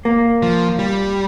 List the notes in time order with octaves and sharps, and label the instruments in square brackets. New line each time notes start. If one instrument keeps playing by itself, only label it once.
[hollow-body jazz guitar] A#3
[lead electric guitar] F3
G3